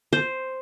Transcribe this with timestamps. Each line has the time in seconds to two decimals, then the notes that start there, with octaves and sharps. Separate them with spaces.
0.13 C5